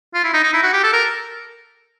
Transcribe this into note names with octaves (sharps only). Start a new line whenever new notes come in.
F4
E4
D#4
D#4
E4
F#4
G4
A4
A#4